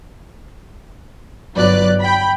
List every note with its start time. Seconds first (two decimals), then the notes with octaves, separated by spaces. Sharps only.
1.56 G1 F#3 B4 D5 F#6
1.99 G5 B5